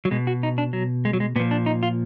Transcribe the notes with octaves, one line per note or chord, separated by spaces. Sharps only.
F#3
B2 G#3
F#4
D#4
D4
F#3
G#3
F#3
G#3
A#2 F3 B3
D4
D#4
F4